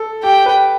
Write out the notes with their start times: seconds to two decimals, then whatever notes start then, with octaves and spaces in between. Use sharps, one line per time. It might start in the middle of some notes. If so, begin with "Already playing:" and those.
Already playing: A4
0.23 G4 G5
0.46 B4